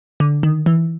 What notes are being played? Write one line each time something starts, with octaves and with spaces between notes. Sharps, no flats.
D3
D#3
E3